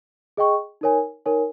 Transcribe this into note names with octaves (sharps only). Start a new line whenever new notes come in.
G#4 D#5 G5 C#6
D#4 A#4 C#5 G#5
D#4 A#4 C#5 G#5